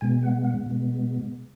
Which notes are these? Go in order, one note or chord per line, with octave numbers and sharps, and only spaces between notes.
B2 G#3 B3 G#5
F#5
F#5
B2 G#3 B3